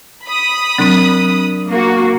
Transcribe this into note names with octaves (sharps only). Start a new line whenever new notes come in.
B5 D#6
C3 F#3 C4 D4 A#4
A#3 F#4